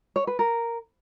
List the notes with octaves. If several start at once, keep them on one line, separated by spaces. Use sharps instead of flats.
C#5
B4
A#4